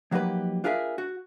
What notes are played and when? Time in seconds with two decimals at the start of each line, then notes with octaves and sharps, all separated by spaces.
0.11 F3 F#3 A#3 D#4 G4 B4
0.64 D4 F4 G#4 A#4 C5 E5
0.98 F#4